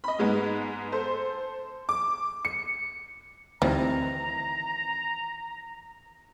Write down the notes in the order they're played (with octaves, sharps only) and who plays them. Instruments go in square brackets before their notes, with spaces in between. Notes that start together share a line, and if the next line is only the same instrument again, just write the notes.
[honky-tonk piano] D#5 B5
G#2 G#3 B3
A4 C5
D6
C#7
[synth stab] D2 C4 [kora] D#3 E3 [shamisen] G3 [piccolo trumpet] A#5